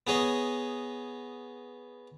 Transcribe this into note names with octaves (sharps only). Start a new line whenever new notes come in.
B3 G#4 C#5 D#5